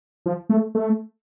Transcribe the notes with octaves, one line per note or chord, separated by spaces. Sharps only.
F3
A3
A3